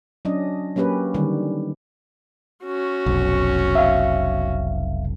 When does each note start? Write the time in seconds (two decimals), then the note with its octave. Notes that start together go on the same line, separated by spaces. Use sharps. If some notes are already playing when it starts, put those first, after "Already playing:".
0.25 F#3 C#4 D4 D#5
0.76 F#3 A#3 C#4 G4 B4
1.14 D3 D#3 G3
2.64 C#4 F#4
3.06 F1 B1
3.75 E5 F5